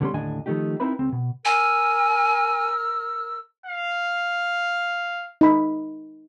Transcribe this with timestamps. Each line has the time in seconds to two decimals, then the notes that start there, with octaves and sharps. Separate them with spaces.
0.01 D2 D3 G3 B3 C#4 C6
0.13 D#2 A2 D3 D4 D#5 G#5
0.46 D#3 F3 A3 D#4 G4
0.80 C4 D#4 E4 A#4 B4 B5
0.99 C#2 C4
1.12 B2
1.45 A#4 G#5 E6 F6
3.66 F5
5.41 D#4 B5